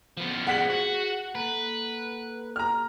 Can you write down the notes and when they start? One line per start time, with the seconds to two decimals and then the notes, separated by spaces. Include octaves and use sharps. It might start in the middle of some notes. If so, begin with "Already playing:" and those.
0.17 F3 B3
0.47 G#4 F#5 B6 F#7
0.69 F#4
1.35 A#3 A4 B4
2.56 A#5 F6